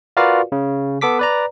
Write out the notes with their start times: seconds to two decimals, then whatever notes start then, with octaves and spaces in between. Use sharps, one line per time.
0.17 F4 F#4 A#4 B4 D5 F5
0.52 C#3
1.01 B3 A4 D6 B6
1.19 B4 D5 A#5